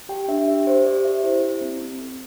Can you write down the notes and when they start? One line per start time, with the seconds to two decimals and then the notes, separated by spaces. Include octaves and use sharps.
0.09 G4 G5
0.28 D4 E5
0.48 G4 E5
0.66 G4 C5
0.85 G4 D5
1.05 G4 E5
1.23 E4 C5
1.43 E4
1.61 C4
1.81 C4
2.00 A4